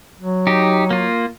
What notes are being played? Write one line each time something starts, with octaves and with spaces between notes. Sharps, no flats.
F#3
D#4 G4
A#3 F4